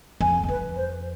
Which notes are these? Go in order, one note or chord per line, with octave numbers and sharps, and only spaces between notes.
F2 G#5
G#2
F2 B4
C5